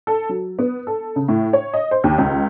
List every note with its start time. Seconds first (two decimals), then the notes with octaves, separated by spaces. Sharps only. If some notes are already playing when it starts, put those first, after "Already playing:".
0.07 A4
0.29 F#3
0.59 B3
0.87 A4
1.16 C#3
1.28 A2
1.53 C#5
1.74 D#5
1.91 C5
2.04 D#2
2.18 C#2